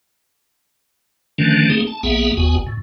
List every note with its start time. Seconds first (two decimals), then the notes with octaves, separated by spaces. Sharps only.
1.38 D3 D#3 F3 A3 C#4 D4
1.70 A3 A#3 C4 D#4 G#4
1.87 A5
2.03 A#1 A#3 B3 G#4 E5 F#5
2.37 G1 D#2 B3 F#4 G#5
2.67 A2